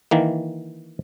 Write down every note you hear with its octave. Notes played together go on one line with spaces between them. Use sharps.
D#3 E3 A#3